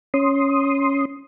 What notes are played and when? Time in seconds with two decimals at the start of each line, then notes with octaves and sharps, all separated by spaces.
0.14 C#4 C6 D#6